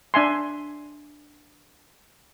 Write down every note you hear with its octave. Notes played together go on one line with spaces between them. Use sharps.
D4 E5 G#5 C6